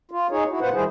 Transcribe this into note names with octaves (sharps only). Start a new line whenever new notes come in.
F4
D#4 G#4 C#5
E4 F#4
A#2 F4 B4 C5 F#5
D#3 G3 E4 G#4 C5